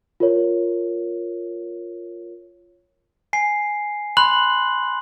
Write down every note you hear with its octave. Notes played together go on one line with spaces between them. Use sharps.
F4 A#4 C#5
G#5 C7
B5 C6 F#6 F#7